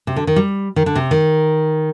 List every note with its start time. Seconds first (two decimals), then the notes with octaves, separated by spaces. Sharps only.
0.07 C3
0.16 D3
0.27 D#3
0.36 G3
0.76 D#3
0.86 D3
0.95 C3
1.11 D#3